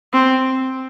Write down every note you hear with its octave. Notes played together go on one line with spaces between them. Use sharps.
C4